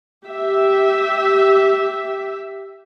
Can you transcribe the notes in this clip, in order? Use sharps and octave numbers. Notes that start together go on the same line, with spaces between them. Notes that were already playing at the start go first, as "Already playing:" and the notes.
G4 E5